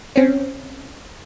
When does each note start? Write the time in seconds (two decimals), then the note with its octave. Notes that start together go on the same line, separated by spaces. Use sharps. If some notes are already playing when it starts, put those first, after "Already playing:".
0.16 C4 C#4